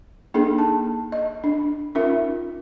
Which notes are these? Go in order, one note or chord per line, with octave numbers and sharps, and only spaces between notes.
A#3 D4 D#4 G#4 A4
A5
D#5
D4
C#4 D#4 F4 A#4 E5